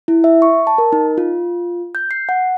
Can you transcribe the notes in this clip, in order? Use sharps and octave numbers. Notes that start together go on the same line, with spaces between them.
E4
E5
C#6
A5
A#4
D#4
F4
G6
C7
F#5